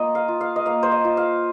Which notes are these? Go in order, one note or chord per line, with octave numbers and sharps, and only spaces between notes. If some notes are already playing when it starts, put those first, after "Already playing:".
Already playing: A#3 F4 D#5
F5
F4
F5
D#5
A#3 F5
C5
D#5
F4
F5